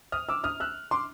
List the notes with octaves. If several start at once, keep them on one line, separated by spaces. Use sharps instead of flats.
D#6 F6
D6 E6
D#6 F6
E6 F#6
C6 D6